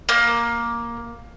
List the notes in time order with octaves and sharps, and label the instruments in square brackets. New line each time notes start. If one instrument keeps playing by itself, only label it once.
[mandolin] A#3